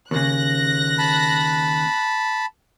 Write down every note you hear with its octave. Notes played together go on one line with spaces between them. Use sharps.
D#2 C#3 F#6 A#6
A5 B5